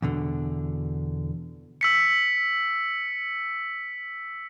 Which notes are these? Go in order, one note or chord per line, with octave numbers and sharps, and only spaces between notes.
E2 B2 D3
E6 B6 C#7